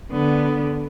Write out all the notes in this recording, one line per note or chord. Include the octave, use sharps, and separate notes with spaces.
D3 B3